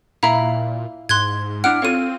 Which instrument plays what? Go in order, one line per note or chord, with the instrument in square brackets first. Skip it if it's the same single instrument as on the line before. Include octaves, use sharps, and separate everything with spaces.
[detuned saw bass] A#2 [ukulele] E4 A#5 B5 [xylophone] E5 F5
[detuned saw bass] G#2 [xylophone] C6 F#6 G#6
[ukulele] D4 E4 F#5 [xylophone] F6 F#6 D7
[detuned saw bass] C4 [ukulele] F4 A4 C#5 [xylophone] F5 D#7